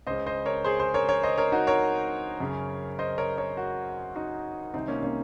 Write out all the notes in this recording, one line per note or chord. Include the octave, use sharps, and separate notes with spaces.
C#2 C#3 C5 D#5
C5 D#5
A#4 C#5
G#4 C5
G#4 C5
A#4 C#5
A#4 C#5
C5 D#5
A#4 C#5
D#4 F#4
A#4 C#5
F#2 C#3
C5 D#5
A#4 C#5
A#4 C#5
F#4 A#4
D#4 F#4
C2 C3 D#3 C4 D#4
A#3 C#4
A#3 C#4